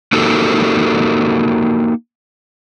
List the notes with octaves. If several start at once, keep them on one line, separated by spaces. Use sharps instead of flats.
A#3 D#4 F#4 G4 A4 A#4